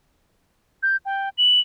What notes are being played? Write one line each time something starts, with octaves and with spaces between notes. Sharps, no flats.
G6
G5
F#7